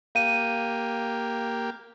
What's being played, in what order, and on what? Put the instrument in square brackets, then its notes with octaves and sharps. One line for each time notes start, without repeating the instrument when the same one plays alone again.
[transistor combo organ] A#3 G4 [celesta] F5 D#7